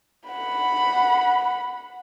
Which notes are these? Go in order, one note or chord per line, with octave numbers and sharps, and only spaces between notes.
F#5 B5